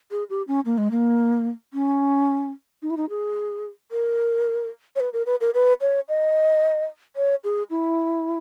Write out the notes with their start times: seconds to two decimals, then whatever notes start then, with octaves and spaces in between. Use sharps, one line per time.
0.11 G#4
0.30 G4
0.48 C#4
0.65 A#3
0.78 G#3
0.91 A#3
1.74 C#4
2.82 D#4
2.90 E4
2.97 D#4
3.09 G#4
3.92 A#4
4.96 C#5
5.00 B4
5.13 A#4
5.26 B4
5.41 A#4
5.54 B4
5.81 C#5
6.09 D#5
7.16 C#5
7.44 G#4
7.70 E4